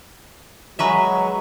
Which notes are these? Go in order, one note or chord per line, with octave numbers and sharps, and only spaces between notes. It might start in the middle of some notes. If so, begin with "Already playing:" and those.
F#3 G#3 B4 E5 A#5 C#6 E6